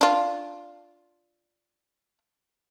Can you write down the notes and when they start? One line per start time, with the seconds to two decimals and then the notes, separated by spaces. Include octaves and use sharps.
0.01 D4 F4